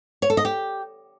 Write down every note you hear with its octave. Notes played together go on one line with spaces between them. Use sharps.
C#5
A4
D#5
G4